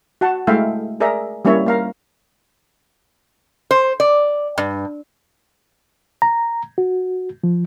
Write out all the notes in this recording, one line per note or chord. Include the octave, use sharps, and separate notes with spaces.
F#4 F#5 A5
G#3 A3 E4 E5 F5 G5
G#4 A#4 D5 E5 A#5
G3 A#3 C#4 E4 C#5 E5
A#3 F5 A#5
C5
D5
G2
A#5
F#4
F3